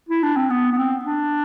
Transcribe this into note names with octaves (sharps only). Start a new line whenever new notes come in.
E4
D4
C4
B3
B3
C4
D4